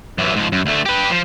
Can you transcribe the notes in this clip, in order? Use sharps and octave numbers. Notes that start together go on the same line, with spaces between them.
F#2 E3
G#2 F3
F#2
D2 A3
G4 B4
F3